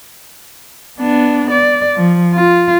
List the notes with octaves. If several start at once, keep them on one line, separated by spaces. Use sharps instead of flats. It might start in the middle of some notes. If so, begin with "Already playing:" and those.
B3 D4
D5
F3
F4